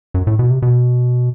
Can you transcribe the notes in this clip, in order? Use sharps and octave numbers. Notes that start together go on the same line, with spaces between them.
F#2
A2
B2
C3
B2